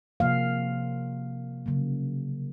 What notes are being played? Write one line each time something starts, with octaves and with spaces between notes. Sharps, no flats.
C3 F3 A#3 F5
C#3 F#3 A#3